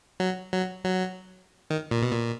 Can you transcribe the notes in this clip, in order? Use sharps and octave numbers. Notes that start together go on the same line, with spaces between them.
F#3
F#3
F#3
D#3
A#2
B2
A#2